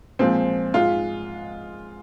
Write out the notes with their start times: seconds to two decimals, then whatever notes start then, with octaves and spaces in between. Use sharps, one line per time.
0.19 A#2 F3 G#3 C4
0.74 G#2 G#3 F4